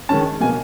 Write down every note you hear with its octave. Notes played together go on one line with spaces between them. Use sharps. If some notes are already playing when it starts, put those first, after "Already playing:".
D#3 G#3 C#4 A5
B2 F#3 A#3 G#5